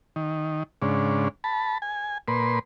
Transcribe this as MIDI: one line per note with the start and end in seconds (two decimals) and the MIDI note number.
0.16 0.63 51
0.82 1.28 44
0.82 1.28 49
0.82 1.28 62
1.44 1.78 81
1.44 1.78 83
1.82 2.18 80
2.28 2.59 46
2.28 2.59 71
2.28 2.59 84